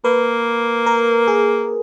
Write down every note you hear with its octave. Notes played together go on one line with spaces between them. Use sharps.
A#3 B4
A#4
G#4